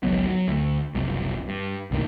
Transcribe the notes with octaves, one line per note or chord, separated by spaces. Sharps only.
G#1 C#2 F#3 B3
F#3
D2
F#1 C2
G2
C2 G2 A#2 D#3